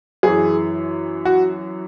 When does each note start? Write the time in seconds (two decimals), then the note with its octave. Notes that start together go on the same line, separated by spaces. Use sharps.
0.23 F#2 E3 G#4
1.25 F#4